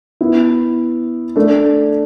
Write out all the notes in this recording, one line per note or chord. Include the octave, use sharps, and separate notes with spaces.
B3 E4
A3 D4